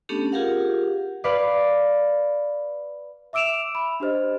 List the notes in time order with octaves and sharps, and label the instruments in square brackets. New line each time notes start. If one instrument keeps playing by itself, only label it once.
[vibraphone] A3 B3 C#4 D4 G4 A4
F4 G4 G#4 A#4 F5 F#5
[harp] B4 D5 F5
[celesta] E5 D6 E6 D7 E7 F7
B5
D4 G4 C5 D#5